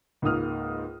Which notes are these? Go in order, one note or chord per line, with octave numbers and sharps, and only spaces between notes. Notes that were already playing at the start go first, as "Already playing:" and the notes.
C#2 G#2 A#3 D#6 F6